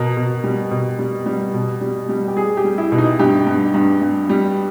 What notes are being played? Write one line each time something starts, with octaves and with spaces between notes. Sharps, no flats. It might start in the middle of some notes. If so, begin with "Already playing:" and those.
Already playing: B2 A#4
B2
G3
B2
G3
G3
B2
G3
G3
G4
G3 G#4
G4
G3
E4
B2
D#4
G2 G4
G2
G2
G2
G3